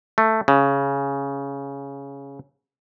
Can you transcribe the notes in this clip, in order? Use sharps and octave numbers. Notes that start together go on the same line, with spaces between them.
A3
C#3